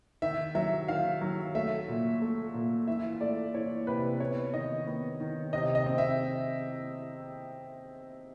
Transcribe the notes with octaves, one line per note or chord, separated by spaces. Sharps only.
D#3 E5
F#3 E5
D#3 F5
F#3
A3 E5
A#2
A3
A#2
E3 E5
A3 D5
E3 C#5
C3 B4
B3 C#5
D#3 D#5
B3
D#3
C3 D#5
D#5
C4
E5